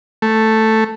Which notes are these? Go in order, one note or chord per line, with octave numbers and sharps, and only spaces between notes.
A3